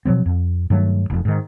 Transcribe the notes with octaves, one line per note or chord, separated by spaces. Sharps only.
B2 F3 F#3 C4
F2
G2 D#3 F#3 A3
F1 F2
G#2 D#3